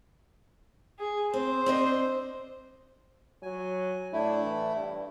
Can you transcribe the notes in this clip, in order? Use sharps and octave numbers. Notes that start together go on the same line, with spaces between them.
G#4
C4 C5
C4 D4 D#5
F#3 G#5
A2 A3 D4 E4
E3
G2